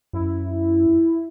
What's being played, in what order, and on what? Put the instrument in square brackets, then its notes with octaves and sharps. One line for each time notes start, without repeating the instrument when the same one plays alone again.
[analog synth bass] F#2 [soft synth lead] E4